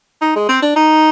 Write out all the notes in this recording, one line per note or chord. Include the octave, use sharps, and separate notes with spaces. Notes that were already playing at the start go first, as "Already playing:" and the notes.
D#4
G#3
C4
D4
D#4